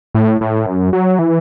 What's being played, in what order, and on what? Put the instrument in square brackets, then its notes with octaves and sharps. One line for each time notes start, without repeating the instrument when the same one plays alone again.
[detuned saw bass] A2
A2
F#2
F#3
E3